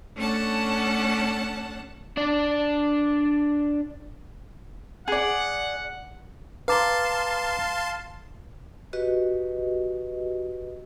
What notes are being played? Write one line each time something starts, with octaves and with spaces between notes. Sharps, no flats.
A3 C#4 D4 F#5 A5
D4 D5
G#4 D5 F#5
B4 F5 A5 A#5 C6 D6
F#4 G4 B4 D#5